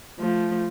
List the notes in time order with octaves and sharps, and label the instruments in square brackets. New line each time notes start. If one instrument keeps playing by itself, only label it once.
[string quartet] F3 A3